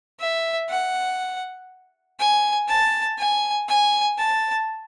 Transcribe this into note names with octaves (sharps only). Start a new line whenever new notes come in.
E5
F#5
G#5
A5
G#5
G#5
A5